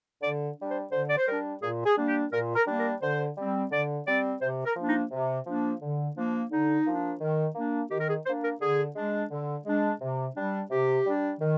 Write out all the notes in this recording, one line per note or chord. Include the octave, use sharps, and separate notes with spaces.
D3 D5
G3 D4
C5
D3 C5
D5
C5
G3 D4 A#4
A#2 G#4
G#4
G3 A#3 D4
G4
A#2 A#4
A#4
G3 A#3 D4
A#4
D3 C5
G3 C4
D3 D5
G3 C4 D5
C3 C5
A#4
F3 A#3 D4
D#4
C3
F3 A#3 D4
D3
F3 A#3 D4
D3 D#4
F3 A#3 D4
D#3
A#3 D4
D#3 G4
A#4
G#4
A#3 D4 C5
A#4
D3 G#4
G#3 D4
D3
G#3 D4
C3
G3 D4
C3 G4
G3 D4
D#3